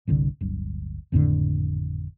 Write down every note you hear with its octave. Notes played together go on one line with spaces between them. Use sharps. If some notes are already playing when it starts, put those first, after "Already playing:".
G1 C2 D3
D1 G1
G#1 F2 A2 D3